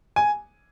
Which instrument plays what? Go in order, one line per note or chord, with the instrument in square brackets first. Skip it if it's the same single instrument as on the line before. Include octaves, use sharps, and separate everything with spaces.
[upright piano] G#5